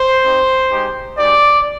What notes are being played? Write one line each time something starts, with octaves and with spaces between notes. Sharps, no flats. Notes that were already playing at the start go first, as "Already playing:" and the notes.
Already playing: C5
C4 D#4 G4
G#3 D#4 G4
G#3 D#4 G4 D5